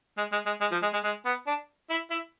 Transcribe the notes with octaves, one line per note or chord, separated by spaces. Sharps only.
G#3
G#3
G#3
G#3
F3
G#3
G#3
G#3
B3
D4
E4
E4